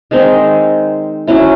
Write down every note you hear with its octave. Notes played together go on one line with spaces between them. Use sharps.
D#3 G#3 C4 D#4
F#3 C#4 E4